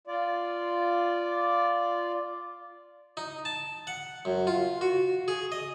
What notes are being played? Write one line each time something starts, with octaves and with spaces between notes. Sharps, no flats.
F4 D5
D#4
A5
F#5
F#2
F4
F#4
G#4
D#5